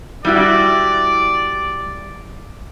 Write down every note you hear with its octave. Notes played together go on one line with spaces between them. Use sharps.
G3 E4 F#4 D5